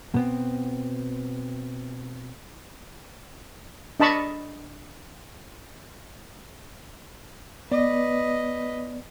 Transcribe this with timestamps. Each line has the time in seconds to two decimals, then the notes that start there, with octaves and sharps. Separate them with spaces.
0.14 B2 B3 C4
4.00 D4 D#5 A5 B5 C#6
7.71 B3 B4 D5 D#5